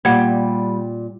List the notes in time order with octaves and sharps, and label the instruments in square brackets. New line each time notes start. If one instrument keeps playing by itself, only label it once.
[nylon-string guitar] A#2 [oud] G3 [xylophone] F#5 G#6